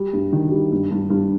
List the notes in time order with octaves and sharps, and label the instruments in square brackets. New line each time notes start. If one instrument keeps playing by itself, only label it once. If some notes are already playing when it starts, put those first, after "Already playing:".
Already playing: [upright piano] G3
G2
D#3
G3
G2
G2
G2